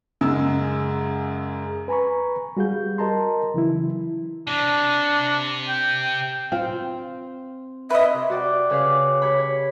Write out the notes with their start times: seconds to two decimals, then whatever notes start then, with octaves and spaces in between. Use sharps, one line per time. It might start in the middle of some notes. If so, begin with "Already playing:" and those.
0.21 F#2 C#3 G#3 E6
1.88 B4 G#5 A#5 B5 C#6
2.57 G3 F#4 G#4 F5 G6
2.98 A#4 D#5 A5 A#5 C6
3.54 C#3 E3 F#3 E4
4.47 C3 D4
5.68 G5
6.52 C4 F4
7.90 B4 D#5 E5
8.13 C3
8.29 F#4 D5 G5
8.70 C#3 B4 C#5 F5 D6
9.22 G4 C#5 B5
9.38 C#5